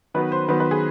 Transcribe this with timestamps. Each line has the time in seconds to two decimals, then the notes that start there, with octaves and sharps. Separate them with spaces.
0.14 D#3 F#3 B3 B4
0.32 C5
0.48 D#3 F#3 B3 B4
0.60 B4
0.71 G#4